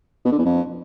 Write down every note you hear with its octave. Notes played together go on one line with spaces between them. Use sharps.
B2
D3
E2
F2